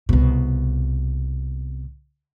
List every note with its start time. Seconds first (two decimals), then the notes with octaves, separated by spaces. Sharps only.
0.09 C2 B2